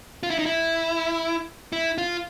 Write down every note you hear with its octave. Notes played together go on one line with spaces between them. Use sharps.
F4
E4
D#4
E4
E4
F4